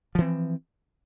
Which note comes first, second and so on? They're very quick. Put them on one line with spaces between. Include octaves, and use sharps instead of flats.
F3 E3 C4